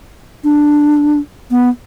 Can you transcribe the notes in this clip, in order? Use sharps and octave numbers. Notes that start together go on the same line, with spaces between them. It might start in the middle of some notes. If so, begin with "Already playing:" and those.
D4
B3